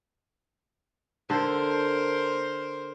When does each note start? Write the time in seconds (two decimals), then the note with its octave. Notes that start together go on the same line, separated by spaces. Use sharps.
1.30 D3 A4 A#4 C5